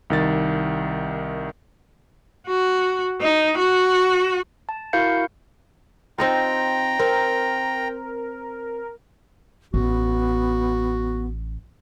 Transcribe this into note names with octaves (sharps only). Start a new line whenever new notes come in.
C2 D#3 A6
F#4
D#4
F#4
A5
E4 F#4 A#4 F5 G6 C#7
C4 D#4 F4 G5 A#5
C4 A#4
A1 B3 F#4